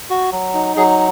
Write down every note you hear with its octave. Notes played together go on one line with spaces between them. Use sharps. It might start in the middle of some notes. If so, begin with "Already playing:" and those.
F#4
F#3
D#4
F#3 G#4